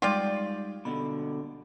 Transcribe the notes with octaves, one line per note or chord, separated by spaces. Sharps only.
G3 G#3 D#4 F4 G4 D5
B2 D3 B5